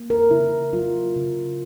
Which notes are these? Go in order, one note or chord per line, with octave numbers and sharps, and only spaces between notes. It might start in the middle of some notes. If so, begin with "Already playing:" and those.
Already playing: A#3
A#4
C#3 E4
F#3 F4
C#3